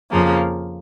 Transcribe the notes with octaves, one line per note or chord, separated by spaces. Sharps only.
F2 C#3 F3 A#3